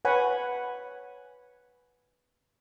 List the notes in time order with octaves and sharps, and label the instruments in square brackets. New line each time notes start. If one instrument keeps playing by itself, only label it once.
[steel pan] B4 C#5 F#5 G#5 B5